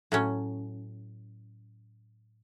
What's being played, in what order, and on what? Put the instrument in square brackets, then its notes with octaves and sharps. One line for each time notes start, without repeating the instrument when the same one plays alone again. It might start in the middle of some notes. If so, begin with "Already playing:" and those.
[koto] A2 F#3 C#4